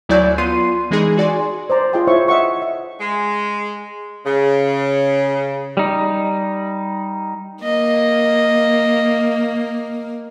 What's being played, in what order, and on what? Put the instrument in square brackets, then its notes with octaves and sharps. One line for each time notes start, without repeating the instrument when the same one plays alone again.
[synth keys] D2 F#3 E4 D5 G#5 G6
B3 F4 C6 C7 D#7
E3 G#3 D#4 G#4
F#4 D5 G#5 C6
[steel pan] C5 D5 A#5
F4 G#4 D#5 G5 C6
E4 C5 C#5 E5 C#6
D#5 E5 F#5 C#6
E5
[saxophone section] G#3
C#3
[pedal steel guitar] G3 D#4
[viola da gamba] A#3 [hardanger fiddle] D#5